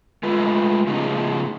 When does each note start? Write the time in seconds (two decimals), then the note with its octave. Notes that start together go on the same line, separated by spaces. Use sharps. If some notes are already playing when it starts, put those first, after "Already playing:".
0.23 G#3 A3 F4 B4
0.87 A2 C#3 F3 C#4 D#4 G#4